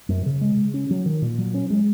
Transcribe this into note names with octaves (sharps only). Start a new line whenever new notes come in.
F#2
C#3
G#3
C#3
C#4
F#3
D#3
A#2
F#3
C#4
G#3